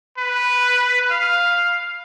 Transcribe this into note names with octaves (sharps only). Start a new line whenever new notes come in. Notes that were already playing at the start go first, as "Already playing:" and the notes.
B4
F5